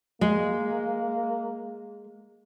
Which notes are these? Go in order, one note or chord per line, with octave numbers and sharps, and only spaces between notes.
G#3 A#3